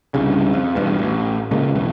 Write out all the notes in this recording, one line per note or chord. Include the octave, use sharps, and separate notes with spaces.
C2 G2 C#3
F2
E2 G2 B2
A1
C#3 G#3 A#3
B1 E2 B2